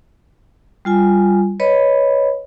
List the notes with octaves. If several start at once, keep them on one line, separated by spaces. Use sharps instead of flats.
G3 F4 G#5
B4 C#5 D#5 B5